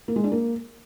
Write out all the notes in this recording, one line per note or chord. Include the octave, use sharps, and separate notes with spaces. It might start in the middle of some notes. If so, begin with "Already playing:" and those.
A#3
G#3
D4
A#3